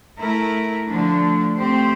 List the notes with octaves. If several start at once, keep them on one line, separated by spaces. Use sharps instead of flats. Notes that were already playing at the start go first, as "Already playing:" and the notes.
A3 E4 A#4
D3 F3 A3 D4
A3 C4 G4 C5